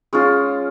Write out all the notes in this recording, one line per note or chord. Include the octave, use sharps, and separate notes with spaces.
G#3 C#4 F4